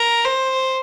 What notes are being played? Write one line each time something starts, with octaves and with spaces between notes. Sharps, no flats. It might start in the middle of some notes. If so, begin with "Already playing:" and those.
Already playing: A#4
C5